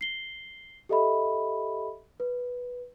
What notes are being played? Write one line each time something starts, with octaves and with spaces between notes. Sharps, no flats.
C7 G7
G4 A4 D#5 E5 B5
B4